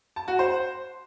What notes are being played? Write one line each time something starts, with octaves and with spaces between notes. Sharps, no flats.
A5
F#4
C5